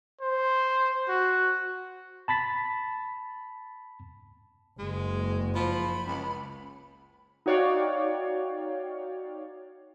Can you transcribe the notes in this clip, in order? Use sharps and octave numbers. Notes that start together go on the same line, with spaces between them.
C5
F#4
A5 B5 A6 B6
F#1 G#3
F3 B5
C#2
D#4 F#4 C#5 D5 F5 G5